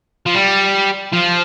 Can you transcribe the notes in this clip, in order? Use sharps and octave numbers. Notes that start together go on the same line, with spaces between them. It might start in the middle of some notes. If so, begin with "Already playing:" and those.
F3
G3
F3